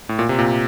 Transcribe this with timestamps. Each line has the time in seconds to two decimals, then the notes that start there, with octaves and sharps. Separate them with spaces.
0.09 A2
0.19 A#2
0.29 C3
0.39 A#2